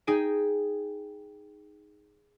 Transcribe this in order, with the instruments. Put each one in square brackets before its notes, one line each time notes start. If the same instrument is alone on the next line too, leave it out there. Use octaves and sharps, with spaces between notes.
[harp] D#4 G#4 G5 G#5